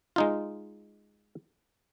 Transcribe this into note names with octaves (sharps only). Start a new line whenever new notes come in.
G#3 D#4 F4